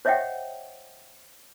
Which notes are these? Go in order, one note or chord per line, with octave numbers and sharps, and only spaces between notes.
C5 C#5 D#5 E5 F#5 G5